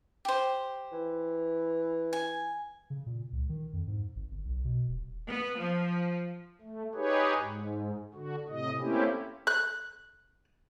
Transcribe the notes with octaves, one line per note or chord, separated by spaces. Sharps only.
G4 C5
E3
G#5
C#3
A#2
C#2
D#3
F2
G#2
G#1
G1
B1
B2
D#1
B3
F3
A3
D#4 G4 G#4 B4 C#5
G#2
D3 F#4
A2 C3 D#5
A3 A#3 C4 C#4 E4 G4
F#6